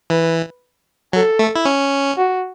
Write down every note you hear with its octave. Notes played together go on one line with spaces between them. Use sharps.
E3 B4
F#3 A4
A3
E4
C#4
F#4